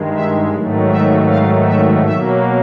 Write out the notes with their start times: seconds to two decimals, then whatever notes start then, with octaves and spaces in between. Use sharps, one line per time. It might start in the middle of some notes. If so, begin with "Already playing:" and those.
Already playing: G2 D#3 G#3
0.13 E5
0.50 G#2 D#3 F#3 A3
0.89 E5
1.27 F5
1.64 E5
2.02 B2 F#3 A#3 E5